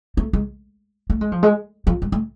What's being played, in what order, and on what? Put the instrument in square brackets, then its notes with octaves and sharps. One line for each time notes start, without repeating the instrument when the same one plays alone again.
[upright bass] A3
G#3
A3
G#3
F3
G#3
F3
G#3
A3